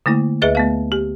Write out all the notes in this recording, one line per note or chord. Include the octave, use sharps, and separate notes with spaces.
D3 A3 A#3 E4
D2 G#4 B4 D#5 E5 A6
A3 B3 F5
G4